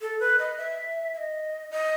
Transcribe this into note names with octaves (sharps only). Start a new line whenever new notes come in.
A4
B4
D#5
E5
E5
D#5
D#5